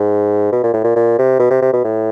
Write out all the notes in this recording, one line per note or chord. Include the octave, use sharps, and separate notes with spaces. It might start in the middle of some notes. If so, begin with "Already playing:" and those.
Already playing: G#2
B2
A#2
A2
A#2
A#2
C3
B2
C3
C3
B2
A2